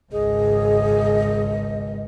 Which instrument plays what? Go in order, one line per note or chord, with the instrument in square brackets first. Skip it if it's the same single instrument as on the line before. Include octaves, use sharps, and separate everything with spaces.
[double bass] G#1 C#2 [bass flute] G#4 [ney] D#5